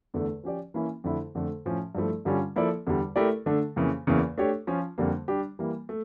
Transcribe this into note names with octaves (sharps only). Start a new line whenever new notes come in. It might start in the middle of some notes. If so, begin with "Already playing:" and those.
E2 D3 A3
F3 C#4 G4 D5
E3 A#3 C#4 E4
F2 D3 A3 E4 A4
F2 D3 A3
A2 F3 C#4
G2 F3 A3 E4
G2 D3 G3 C#4 F4
F3 A#3 E4 A4 D5
E2 D3 G3
A3 E4 G4 A#4 D5
D3 A3 D4
F2 C#3 E3 A#3
E2 C#3 E3 A#3
A3 D4 G4 C#5
F3 C#4 F4
F2 D3 G3 A#3
G3 D4 G4
E3 G3 A#3
A3